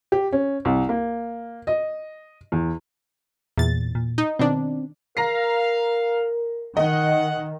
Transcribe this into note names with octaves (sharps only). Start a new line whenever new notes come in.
G4
C#4
C2
A#3
D#5
E2
E2 A#2 A6
A#2
D#4
B2 D#3 C4 D4
A#4 F5 A#5 A#6 C7
D#3 D#5 F#5